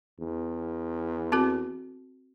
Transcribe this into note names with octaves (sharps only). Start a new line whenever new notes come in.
E2
C4 F#4 A4